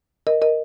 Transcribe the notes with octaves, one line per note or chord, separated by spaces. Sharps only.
A#4 D#5
A#4 D#5